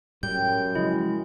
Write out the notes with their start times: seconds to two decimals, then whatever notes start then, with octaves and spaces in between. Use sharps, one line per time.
0.23 F#2 A2 G3 G5 G6
0.75 C#3 F3 F#3 G#3 E4